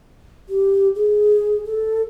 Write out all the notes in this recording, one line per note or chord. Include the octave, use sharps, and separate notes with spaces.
G4
G#4
A4